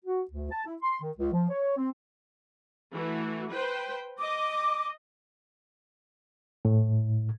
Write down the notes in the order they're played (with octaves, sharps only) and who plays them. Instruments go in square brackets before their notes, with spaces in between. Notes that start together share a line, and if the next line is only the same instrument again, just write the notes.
[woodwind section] F#4
D2
A5
E4
C6
D#3
C#2
F3
C#5
C4
[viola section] E3 A3 F#4
B4 C5 G5
[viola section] D#5 [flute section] D6
[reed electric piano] A2